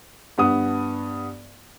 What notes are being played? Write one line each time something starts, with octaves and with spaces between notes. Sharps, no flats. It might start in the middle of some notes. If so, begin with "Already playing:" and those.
G2 B3 D#6